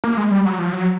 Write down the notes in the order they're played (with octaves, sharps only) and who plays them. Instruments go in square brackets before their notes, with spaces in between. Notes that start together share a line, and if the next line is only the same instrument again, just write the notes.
[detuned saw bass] A#3
G#3
G3
F#3
F3
F#3